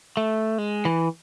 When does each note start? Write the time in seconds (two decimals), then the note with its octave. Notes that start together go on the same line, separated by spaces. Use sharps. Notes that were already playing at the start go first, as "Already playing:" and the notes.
0.17 A3
0.58 G#3
0.85 E3